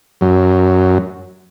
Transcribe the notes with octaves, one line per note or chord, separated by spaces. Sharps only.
F#2